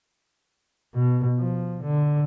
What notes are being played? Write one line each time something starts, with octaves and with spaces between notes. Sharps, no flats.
B2
F3
D3